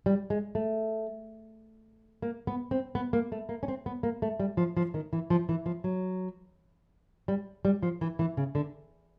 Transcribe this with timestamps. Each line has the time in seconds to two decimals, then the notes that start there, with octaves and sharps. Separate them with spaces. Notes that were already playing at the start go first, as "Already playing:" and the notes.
0.06 G3
0.30 G#3
0.55 A3
2.22 A#3
2.47 B3
2.71 C4
2.95 B3
3.13 A#3
3.32 A3
3.49 A#3
3.63 C#4
3.68 C4
3.86 B3
4.03 A#3
4.22 A3
4.40 G3
4.57 F3
4.77 F3
4.94 D#3
5.13 E3
5.30 F3
5.49 E3
5.66 F3
5.84 F#3
7.28 G3
7.65 G3
7.83 F3
8.01 E3
8.19 E3
8.37 C#3
8.55 D3